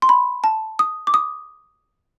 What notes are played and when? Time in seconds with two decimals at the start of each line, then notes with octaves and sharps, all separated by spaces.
0.02 C6
0.09 B5
0.44 A5
0.79 D#6
1.07 D6
1.14 D#6